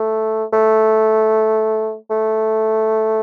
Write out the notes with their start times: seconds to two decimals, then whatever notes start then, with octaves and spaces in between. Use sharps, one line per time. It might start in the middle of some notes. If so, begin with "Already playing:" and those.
Already playing: A3
0.53 A3
2.10 A3